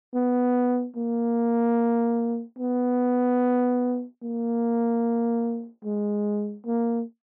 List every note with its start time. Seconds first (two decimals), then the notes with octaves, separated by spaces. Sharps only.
0.14 B3
0.96 A#3
2.58 B3
4.22 A#3
5.84 G#3
6.66 A#3